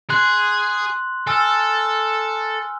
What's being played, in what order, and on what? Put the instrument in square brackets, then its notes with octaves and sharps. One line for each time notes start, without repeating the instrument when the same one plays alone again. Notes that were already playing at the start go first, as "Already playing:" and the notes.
[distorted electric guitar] G#4 [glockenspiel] C6 F#6 F#7
[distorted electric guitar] A4 [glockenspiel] G#5 E6 F6